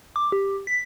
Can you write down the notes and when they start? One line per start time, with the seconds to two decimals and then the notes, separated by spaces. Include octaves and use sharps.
0.16 D6
0.32 G4
0.67 B6